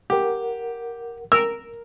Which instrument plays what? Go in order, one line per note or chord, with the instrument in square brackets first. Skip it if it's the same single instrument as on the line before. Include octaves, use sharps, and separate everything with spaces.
[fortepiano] G4 [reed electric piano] A#4 F#5
[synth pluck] A#4 [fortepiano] E6